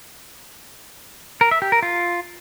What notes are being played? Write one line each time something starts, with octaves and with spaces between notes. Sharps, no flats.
A#4
E5
G4
A#4
F4